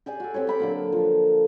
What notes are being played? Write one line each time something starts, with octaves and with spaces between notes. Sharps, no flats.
G4 G#4 D5 G#5
F#4 A4
C4 G4 C5 C#5
G4 B5 D6
D3 F#3 A#3
F3